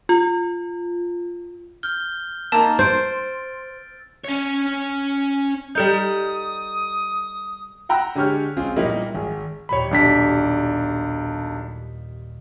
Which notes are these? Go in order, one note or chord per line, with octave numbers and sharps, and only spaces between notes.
F4
F6 G6 G7
A#3 D#4 A5 E6 A6
C5 C6 G6 A6 D7
C#4 C#5
G3 D#4 A4 D#6 G6
F#5 G5 A#5 B5 E6 F#6
D3 G#3 G4 C#5 F6
G#3 C4 C#4 F4 G#4
A#2 F#3 G3 A#3 D#4 E4
G#1 G#4
D#2 A#2 G3 C#5 B5
B1 D4 B6